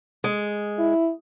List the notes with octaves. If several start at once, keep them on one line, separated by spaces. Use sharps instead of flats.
G#3
E4